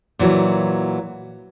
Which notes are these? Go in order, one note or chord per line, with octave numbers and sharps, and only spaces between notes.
A#2 E3 F#3